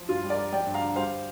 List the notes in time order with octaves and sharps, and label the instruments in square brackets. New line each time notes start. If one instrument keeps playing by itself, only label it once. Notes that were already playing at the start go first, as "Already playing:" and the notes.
Already playing: [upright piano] F3
G2 F4
G3
A#4 D5
G3
F3 D5 G5
G2
F5 A#5
D3
G3 C5 F5